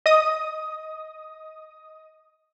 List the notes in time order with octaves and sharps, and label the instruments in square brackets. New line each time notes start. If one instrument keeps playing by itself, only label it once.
[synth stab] D#5 D#6